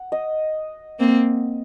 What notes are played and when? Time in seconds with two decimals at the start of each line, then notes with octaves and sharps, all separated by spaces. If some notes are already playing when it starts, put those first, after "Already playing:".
Already playing: F#5
0.12 D#5
0.99 A#3 C4